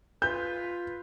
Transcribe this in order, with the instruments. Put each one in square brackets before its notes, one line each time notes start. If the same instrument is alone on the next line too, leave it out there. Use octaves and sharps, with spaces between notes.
[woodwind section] F4 B4 [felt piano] G6